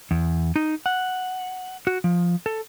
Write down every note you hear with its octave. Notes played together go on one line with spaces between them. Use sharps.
E2
D#4
F#5
F#4
F3
A4